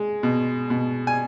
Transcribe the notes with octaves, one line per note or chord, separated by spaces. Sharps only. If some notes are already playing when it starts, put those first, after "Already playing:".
Already playing: G#3
B2
B2
G#5